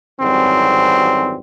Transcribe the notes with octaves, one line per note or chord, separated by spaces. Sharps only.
G#1 F#2 E3 G3 C4